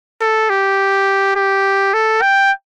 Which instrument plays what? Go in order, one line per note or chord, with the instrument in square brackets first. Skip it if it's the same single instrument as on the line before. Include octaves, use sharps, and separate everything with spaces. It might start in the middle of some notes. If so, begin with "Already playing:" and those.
[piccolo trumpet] A4
G4
G4
A4
G5